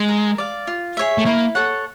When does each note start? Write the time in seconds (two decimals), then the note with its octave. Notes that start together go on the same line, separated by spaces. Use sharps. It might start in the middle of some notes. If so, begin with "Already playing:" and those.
Already playing: G#3
0.08 A#4
0.38 D5 F5
0.67 F4
0.97 G#4 C#5 E5
1.18 A3
1.26 A#3 E4
1.55 A4 C#5 F#5